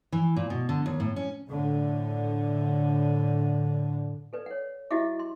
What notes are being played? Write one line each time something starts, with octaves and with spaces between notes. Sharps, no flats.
E3
A#2
B2
D3
D#2
A2
C#4
A2 D3
A4 B4 D5
C#5 F#5
E4 F#4 G4 D#5 E5 D6
C6